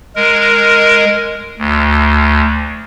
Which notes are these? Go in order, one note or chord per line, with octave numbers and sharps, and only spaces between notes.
G#3 A#4
D2